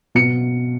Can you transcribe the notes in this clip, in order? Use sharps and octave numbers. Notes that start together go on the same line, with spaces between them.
B2 C#7